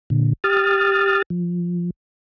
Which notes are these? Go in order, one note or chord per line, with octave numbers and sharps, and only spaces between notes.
A#2 D3
G4 D#6 F6 A6
F3